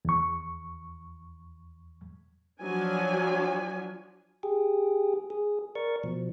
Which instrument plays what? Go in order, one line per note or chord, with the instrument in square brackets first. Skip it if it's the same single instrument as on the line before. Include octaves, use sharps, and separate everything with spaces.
[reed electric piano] E2 C#6
[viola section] F3 F#3 D4 G#5
[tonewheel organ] G4 G#4
G#4
A#4 D5 C#6
B2 F3